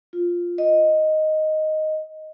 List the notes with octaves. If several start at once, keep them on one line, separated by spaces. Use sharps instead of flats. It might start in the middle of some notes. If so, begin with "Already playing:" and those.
F4
D#5